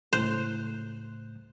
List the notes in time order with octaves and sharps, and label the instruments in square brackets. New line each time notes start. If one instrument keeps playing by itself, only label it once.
[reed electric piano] C#2 A2 F#6 [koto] C5